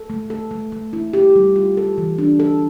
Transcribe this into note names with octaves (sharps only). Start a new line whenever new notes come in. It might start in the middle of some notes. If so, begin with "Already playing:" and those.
Already playing: A4
A3
A4
A3
A3
E4
G4
G3
F4
A4
E3
D4
A4